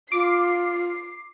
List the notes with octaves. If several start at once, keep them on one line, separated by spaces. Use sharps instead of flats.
F4 D6 C7